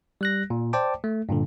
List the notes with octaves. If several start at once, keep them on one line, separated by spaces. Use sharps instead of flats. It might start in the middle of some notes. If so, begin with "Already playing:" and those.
G3 F#6 A#6
A#2
C5 D5 G5 A5 D6
A3
G2 A#2 D3